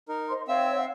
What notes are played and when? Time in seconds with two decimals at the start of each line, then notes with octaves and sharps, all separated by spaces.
0.09 D#4 A#4
0.29 C5 D#5 C6
0.48 C4 C#5 E5 F5 G5 E6
0.76 F5 F#5